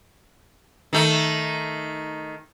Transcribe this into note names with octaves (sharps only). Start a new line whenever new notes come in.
D#3 A3